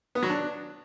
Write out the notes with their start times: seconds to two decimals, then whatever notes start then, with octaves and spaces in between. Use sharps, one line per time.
0.15 B3
0.23 F#3
0.30 D4